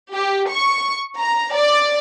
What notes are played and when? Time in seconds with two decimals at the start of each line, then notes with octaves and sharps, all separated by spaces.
0.13 G4
0.50 C#6
1.19 A#5
1.54 D5